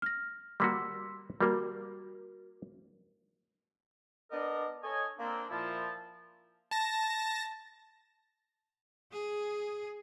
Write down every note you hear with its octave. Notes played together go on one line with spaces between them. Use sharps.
F6 A#6
G3 A#3 F#4 C6 E6 B6
G3 A#3 F#4 A#4
B3 D4 A#4 D5 D#5
A4 C#5 D#5 G#5
A#3 C4 D4
A#2 F3 E4 A5
A5 A#6
G#4